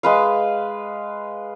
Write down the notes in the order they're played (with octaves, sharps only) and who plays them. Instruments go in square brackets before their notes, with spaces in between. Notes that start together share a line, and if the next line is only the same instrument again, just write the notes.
[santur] G#3 B4 F5